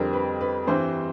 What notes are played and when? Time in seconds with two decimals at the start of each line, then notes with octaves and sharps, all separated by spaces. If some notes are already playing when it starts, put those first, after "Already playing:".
Already playing: F2 D3 G3 C4 A#4
0.13 B4
0.41 B4
0.67 G2 E3 G3 C4 C5